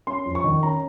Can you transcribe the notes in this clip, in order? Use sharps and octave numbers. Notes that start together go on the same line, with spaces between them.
C#4 C6
F2
C#6
D#3
C#4 A#5